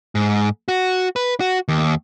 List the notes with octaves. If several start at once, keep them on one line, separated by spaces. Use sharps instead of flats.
G#2
F#4
B4
F#4
D#2